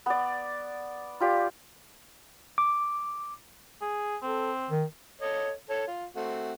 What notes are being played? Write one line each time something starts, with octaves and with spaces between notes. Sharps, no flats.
B3 D5
F4 G4 D5
D6
G#4
C4 A4
D#3
A4 C#5 D#5
A4 C#5
F4
A3 C4 F#4